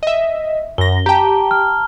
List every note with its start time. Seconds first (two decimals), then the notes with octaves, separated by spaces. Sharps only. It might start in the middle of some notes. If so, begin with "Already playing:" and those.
0.03 D#5 E5
0.78 F#2 A#6 G7
1.06 G4 G5 A5 A#5
1.51 F6